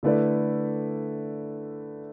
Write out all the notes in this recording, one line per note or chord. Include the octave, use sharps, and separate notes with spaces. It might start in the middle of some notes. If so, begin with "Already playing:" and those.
D3 A3 E4 B4 D5